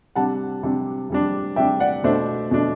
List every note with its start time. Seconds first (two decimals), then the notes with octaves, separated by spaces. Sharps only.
0.15 C3 G3 D4 F#5 A5
0.63 C3 G3 D4
1.10 C3 G3 D4
1.56 C3 G3 D4 E5 G5
1.80 D5 F#5
2.04 B2 A3 D4 C5 E5
2.51 B2 A3 D4